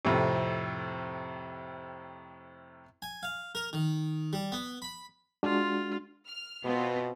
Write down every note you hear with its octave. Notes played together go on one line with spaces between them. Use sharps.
F2 A2 C3
G#5
F5
A#4
D#3
G3
B3
B5
G#3 D4 F4 F#4
F6
B2 B3 C4 F4